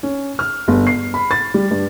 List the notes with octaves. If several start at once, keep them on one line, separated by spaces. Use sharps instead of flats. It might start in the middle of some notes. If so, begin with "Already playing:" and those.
C#4
F6
G1
C7
B5
A6
G3
G2